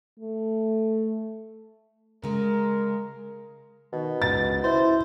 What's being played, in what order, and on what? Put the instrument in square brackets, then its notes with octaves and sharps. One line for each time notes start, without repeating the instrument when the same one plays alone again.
[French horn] A3
[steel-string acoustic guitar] C#3 G#3 [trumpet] A#4
[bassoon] B2 [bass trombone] D#3
[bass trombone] C#2 [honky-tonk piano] A6
[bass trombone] E4 [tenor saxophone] C5